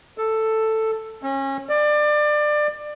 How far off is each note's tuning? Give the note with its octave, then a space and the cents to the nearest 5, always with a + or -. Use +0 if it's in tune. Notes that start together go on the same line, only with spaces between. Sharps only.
A4 +5
C#4 -30
D5 +25